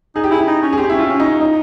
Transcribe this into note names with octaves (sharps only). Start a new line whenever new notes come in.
D#4 G#4
G4
E4 G#4
D#4
C#4
G#4
C4 G4
E4
C#4
F4
C#4
C#4 D#4
D#4